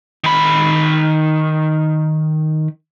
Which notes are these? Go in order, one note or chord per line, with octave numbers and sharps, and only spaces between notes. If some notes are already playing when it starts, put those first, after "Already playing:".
D#3 B5